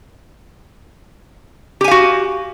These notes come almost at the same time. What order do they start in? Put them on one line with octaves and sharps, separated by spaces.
G4 G#5 F5 F#4